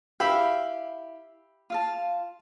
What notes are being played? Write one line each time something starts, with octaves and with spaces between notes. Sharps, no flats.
E4 G4 E5 F5 B5 E6
F4 F5 A5